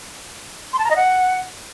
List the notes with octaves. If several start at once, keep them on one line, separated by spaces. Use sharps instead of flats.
C6
A5
A#5
D#5
F#5